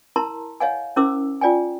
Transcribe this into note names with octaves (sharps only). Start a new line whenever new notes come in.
E4 A#4 A5 A#5 C6
C#5 D#5 F5 F#5 G#5
C#4 E4 A#4 C5 D6 E6
F4 D5 G5 G#5